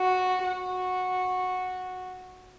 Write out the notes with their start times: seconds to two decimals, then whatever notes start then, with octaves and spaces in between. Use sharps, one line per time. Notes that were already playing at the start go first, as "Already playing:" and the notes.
Already playing: F#4
0.43 F#4